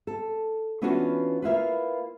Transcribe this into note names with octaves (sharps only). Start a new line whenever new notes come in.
A4
E3 B3 C#4 D4 F4 F#4
A#3 E4 F4 B4